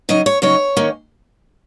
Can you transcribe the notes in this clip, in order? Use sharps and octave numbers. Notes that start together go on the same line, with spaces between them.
C#3 F#3 D#4 D#5
C#5
C#3 F#3 D#4 C#5
D#3 A#3 C#4